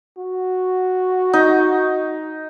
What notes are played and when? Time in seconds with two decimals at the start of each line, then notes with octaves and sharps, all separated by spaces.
0.17 F#4
1.33 D#4